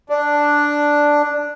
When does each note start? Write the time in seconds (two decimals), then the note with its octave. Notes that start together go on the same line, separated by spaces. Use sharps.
0.09 D4